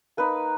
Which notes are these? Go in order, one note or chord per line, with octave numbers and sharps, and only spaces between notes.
A#3 D#4 B4